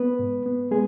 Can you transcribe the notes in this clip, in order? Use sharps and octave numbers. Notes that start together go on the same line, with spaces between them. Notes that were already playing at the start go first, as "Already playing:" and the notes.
Already playing: B3 B4
G#2
B3
G#3 B3 G#4